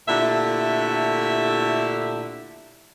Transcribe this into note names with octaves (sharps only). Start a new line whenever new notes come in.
A#2 D3 A3 E4 G4 E5